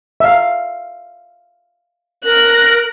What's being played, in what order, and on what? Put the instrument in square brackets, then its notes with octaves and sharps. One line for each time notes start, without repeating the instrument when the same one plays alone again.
[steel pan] E5 F5
[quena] A#4 [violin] F#6 A#6